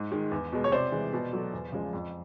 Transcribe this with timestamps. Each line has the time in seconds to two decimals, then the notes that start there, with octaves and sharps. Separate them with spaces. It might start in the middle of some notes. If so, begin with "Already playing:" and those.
Already playing: G#2
0.12 D#3 G#3
0.32 E2
0.52 B2 G#3
0.64 C#5
0.72 C3 C5 D5
0.92 E3 G#3
1.13 B2
1.33 F#3 A3
1.53 E2
1.72 C#3 F3 G#3
1.93 F2